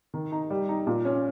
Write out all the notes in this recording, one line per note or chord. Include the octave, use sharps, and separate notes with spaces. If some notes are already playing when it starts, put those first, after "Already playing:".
D#3
D#4
G3
D#4
A#2
C#4